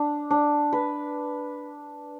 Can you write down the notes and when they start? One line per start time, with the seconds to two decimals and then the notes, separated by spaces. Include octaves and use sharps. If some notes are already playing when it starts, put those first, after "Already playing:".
Already playing: D4
0.31 D4
0.73 B4